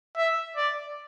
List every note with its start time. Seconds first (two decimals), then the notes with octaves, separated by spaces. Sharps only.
0.17 E5
0.56 D5